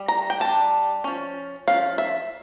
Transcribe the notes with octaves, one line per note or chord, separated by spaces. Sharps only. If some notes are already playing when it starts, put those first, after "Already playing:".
Already playing: G3
A#5
G5
G3 D4 A5
F3 C#4
F3 C#4 F5
E5